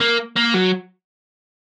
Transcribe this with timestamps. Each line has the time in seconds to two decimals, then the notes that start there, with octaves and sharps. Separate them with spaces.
0.01 A#3
0.37 A#3
0.55 F#3